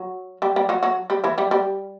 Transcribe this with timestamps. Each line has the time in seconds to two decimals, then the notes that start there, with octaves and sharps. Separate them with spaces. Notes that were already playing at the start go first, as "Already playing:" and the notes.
Already playing: F#3 F#4
0.42 G3 G4
0.56 G3 G4
0.69 F#3 F#4
0.83 F#3 F#4
1.10 G3 G4
1.24 E3 E4
1.38 G3 G4
1.51 G3 G4